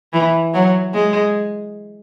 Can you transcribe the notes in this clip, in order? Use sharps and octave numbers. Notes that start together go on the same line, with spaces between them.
E3
F#3
G#3